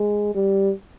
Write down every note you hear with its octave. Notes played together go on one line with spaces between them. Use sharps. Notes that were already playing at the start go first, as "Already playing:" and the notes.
Already playing: G#3
G3